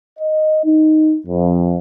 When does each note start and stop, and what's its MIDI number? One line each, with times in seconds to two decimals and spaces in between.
0.19 0.61 75
0.65 1.17 63
1.27 1.79 41